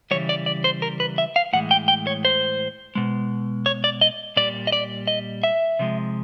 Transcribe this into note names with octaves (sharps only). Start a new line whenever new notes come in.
C#3 E3 G3 C#5
D5
D5
C5
A#4
B4
E5
F5
A2 E3 G#3 F#5
G5
G5
C#5
C5
B2 G#3
C#5
D5
D#5
A#2 G3 D5
D#5
D5
D#5
E5
C3 F3 G#3